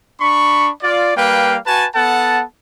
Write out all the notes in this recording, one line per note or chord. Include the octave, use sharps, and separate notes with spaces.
D4 B5 C#6
F4 D5
G3 A#3 B4 F5 G5
F#4 B4 G#5 A5
B3 A4 F#5 A5